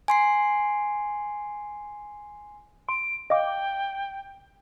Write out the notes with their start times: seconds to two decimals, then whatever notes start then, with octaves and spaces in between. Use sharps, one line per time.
0.08 G#5 C6 C7
2.89 C6 D7
3.30 D#5 F5 G5 D6